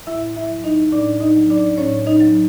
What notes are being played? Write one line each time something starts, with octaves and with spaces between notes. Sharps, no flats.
A2 E4 E5
E4 E5
F#3
D#4 D#5
A2 D4 D5
D#4 D#5
F#3
D4 D5
A2 C#4 C#5
D#4 D#5
F#3